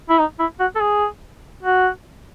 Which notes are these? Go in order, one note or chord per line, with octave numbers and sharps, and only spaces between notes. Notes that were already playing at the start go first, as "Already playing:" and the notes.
E4
D#4
E4
F#4
A4
G#4
F#4